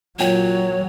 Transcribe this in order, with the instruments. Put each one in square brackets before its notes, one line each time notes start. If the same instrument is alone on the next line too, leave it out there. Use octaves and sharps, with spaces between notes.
[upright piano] A#2 G5 [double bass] F#3 [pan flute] C#5